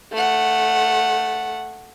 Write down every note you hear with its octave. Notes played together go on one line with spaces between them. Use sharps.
A3 F#5